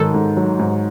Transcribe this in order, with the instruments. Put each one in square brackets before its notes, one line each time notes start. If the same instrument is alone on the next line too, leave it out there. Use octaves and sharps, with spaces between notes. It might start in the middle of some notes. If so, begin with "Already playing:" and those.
Already playing: [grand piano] G#2 D#3 F#3 [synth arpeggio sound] A4
[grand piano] G#2
F#3
G#2